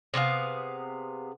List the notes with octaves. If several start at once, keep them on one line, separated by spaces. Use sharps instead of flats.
C3 B3 G#4 F5